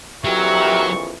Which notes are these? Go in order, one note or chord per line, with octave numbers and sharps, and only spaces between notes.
A#1 F2 E3 F#3 G4 A#4 E5 C#6